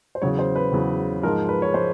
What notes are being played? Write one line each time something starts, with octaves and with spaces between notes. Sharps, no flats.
C5
E2 C#3 F#3 C#5
C5
B4
E2 C#3 F#3
G#2 F3 G#3 A#4
B4
C#5
F3 G#3 C5